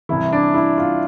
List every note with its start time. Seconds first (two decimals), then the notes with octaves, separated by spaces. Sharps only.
0.09 C2 C3 E3 E4
0.33 D4
0.54 E4
0.78 F4